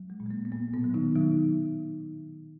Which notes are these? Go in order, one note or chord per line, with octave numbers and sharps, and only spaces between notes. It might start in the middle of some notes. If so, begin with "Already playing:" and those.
Already playing: F#3
G#3
A#2
G#3
A#3
B3
A#2 A#3
B2 B3
F#3
D#3 D#4
D#3 F#3 D#4